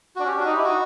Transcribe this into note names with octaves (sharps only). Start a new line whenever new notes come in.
D4 F#4
C#4 G4
D4
F#4
D#4
E4 G4
D#4 F#4